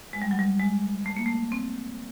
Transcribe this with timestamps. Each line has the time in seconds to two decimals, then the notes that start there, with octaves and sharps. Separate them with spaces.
0.13 G#3
0.22 G3
0.31 F#3
0.39 G3
0.60 G#3
1.06 A3
1.17 A#3
1.26 A3
1.52 C4